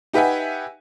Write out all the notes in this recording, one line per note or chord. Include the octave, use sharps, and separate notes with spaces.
D#4 G4 B4 E5 F#5 G#5